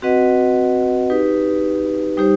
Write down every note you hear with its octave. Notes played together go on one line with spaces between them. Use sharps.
C4 F#4 B4 D#5 F#5
D#4 G4 B4
G3 D#4 G4 C5